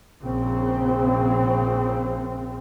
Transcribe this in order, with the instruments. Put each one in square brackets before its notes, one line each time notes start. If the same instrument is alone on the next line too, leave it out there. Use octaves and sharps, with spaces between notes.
[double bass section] A#1 C#3 C4